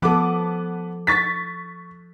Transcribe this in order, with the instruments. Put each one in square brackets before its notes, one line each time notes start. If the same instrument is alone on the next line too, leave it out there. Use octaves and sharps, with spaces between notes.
[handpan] F3 A4 [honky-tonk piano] B3 D6
[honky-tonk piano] C#6 A6 B6